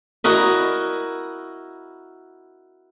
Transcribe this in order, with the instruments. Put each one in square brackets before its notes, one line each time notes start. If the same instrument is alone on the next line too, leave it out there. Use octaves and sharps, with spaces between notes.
[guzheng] E4 F#4 A#4 D#5